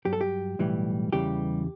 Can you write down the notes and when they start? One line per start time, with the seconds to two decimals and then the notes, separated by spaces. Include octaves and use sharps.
0.05 G2 F#3 G4
0.13 A4
0.21 G4
0.59 B1 A2 E3 G3
1.13 E2 C#3 E3 G3 G4